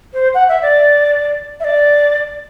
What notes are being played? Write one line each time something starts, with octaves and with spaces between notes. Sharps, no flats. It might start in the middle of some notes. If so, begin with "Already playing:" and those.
C5
F#5
E5
D5
E5
D5